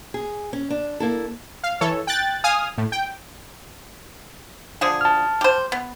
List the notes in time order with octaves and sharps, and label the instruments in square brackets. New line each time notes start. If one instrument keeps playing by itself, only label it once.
[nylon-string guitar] G#4
C#4
D4
A#3 E4 A4
[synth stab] F5
E3 A4 C#5
G5 F#6 A6
F5 G#5 D#6 F6
A2
G5
[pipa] D3 F3 G#4
[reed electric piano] A5 F6
[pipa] G4 C5
B3